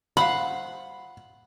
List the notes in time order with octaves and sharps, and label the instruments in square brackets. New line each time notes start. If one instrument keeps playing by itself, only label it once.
[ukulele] C5 F5 [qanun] F#5 [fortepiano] B5